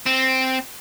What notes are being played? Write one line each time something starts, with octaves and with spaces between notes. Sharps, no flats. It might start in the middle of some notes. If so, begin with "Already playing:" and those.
C4